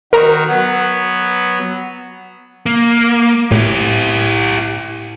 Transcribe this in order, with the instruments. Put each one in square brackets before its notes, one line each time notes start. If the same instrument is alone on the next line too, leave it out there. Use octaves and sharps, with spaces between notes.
[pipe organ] D#3 F#4 [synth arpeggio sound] A#4 A#5
[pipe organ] F#3 B3 [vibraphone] F#5
[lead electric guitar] A#3
[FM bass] A2 [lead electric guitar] E4 G4